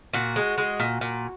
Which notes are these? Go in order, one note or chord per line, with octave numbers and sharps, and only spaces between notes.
A#2 F#4
G#3
G#3
A#2
A#2